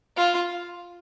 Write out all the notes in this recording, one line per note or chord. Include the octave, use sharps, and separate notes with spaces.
F4